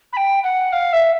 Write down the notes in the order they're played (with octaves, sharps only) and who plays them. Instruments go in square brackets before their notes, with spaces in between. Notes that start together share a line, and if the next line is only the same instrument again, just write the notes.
[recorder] B5
G5
F#5
F5
E5